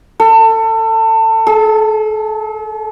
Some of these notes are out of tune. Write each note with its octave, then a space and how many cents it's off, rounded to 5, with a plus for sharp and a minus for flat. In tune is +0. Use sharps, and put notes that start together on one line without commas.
A4 +25
A4 -40